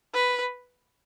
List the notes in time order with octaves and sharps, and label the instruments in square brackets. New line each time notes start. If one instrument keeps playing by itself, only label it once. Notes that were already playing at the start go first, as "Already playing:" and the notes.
[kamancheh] B4